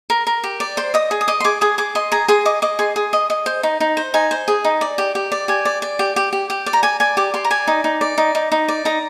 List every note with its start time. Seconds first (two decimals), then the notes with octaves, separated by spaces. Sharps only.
0.10 A#4
0.27 A#4
0.44 G4
0.60 D5
0.77 C5 C6
0.94 D#5 D#6
1.11 G#4
1.21 D#6
1.28 D#5 D6
1.40 C6
1.44 G#4 D6
1.61 G#4 D#6
1.78 G#4 D6
1.95 D#5 C6
2.12 G#4 A#5
2.28 G#4 C6
2.45 D#5 D6
2.62 D#5 D6
2.79 G#4 C6
2.96 G#4
3.13 D#5
3.30 D#5
3.46 C5
3.63 D#4
3.80 D#4
3.97 C5
4.14 D#4 G#5
4.31 C5
4.48 G#4
4.64 D#4
4.81 D5
4.98 G4
5.15 G4
5.32 D5
5.48 G4 G#5
5.65 D5
5.82 D5
5.99 G4
6.16 G4
6.33 G4
6.50 G4
6.66 D5
6.73 A#5
6.83 D5 G#5
7.00 D5 G#5
7.17 G4 D6
7.34 G4 C6
7.44 A#5
7.51 D5 G#5
7.67 D#4
7.84 D#4
8.01 D5
8.18 D#4
8.35 D#4
8.52 D#4
8.68 D5
8.85 D#4 A#5